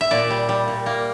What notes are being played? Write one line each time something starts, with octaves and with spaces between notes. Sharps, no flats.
E5
A#2 D5
G3
G3
A#2
A#3